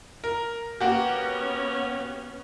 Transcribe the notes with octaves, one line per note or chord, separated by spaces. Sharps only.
A#4
A#3 B3 C#4 F#4 G4